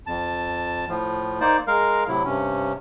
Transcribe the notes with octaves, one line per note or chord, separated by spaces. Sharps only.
F2 A5
A2 F3
A#3 D#4 C5 D5
G#3 A#4 F5
A2 C3 F#3 E4
G2 C3 C#4